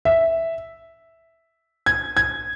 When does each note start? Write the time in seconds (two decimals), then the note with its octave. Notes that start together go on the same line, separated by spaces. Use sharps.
0.05 E5
1.86 G#6
2.17 G#6